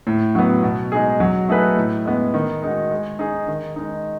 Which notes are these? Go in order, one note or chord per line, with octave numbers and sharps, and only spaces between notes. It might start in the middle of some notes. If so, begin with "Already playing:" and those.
A2
F#3 B3
B2
G#3 D#4 G#4
F#3
A3 D#4 G#4 B4
A2
G#3 B3
D#3
G#3 D#4 F#4
G#3
D#4 G#4
D#3
G#3 D#4